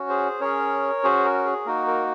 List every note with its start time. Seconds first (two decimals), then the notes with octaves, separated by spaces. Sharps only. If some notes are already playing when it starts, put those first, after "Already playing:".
Already playing: C#4 F#4
0.09 G#4 C5
0.40 C#4 G#4 A#4 C#5
1.03 C#4 F#4 G#4 C5
1.25 A#4
1.45 G#4
1.66 A#3 D#4 F#4 A#4
1.87 A#4